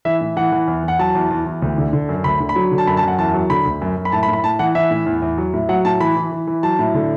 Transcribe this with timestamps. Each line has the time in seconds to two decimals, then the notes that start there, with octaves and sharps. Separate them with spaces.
0.05 E3 E5
0.21 A2
0.37 E3 F#5
0.52 E3
0.68 E2
0.83 E3 F#5
0.99 F#3 A5
1.15 E2
1.31 E2
1.46 E2
1.62 D2
1.78 D3
1.93 D3
2.09 F#2
2.24 D2 B5
2.40 D3
2.49 B5
2.56 F#3
2.71 D3
2.78 A5
2.87 F#2 B5
2.97 A5
3.03 F#2 F#5
3.18 E2 A5
3.34 F#3
3.50 D3 B5
3.65 D2
3.82 F#2
3.97 F#2
4.05 B5
4.12 A2 A5
4.23 B5
4.28 A2
4.33 B5
4.44 A2 A5
4.59 E3 F#5
4.75 E3 E5
4.91 A2
5.06 E2
5.22 E2
5.38 F#3
5.54 A2
5.69 F#3 F#5
5.85 A2 A5
6.00 E3 B5
6.16 E3
6.32 E3
6.47 E3
6.63 F#3 A5
6.79 A2
6.94 D3